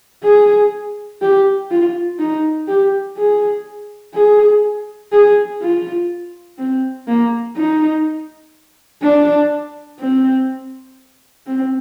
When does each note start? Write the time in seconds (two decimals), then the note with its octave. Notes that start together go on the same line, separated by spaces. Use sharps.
0.24 G#4
1.22 G4
1.71 F4
2.19 D#4
2.68 G4
3.17 G#4
4.15 G#4
5.12 G#4
5.61 F4
6.58 C4
7.08 A#3
7.57 D#4
9.02 D4
10.00 C4
11.47 C4